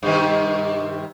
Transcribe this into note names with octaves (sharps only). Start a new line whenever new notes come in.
G2 C3 D#3